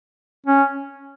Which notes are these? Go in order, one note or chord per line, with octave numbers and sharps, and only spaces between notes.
C#4